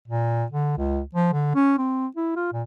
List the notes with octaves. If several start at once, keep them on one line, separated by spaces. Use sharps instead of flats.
A#2
D3
C#2
F3
D3
C#4
C4
E4
F4
A#2